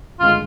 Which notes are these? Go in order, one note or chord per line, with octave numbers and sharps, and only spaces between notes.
G1 D#3 G#3 F4